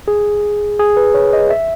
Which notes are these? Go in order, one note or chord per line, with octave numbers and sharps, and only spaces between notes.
G#4
G#4
B4
C#5
D#5
E5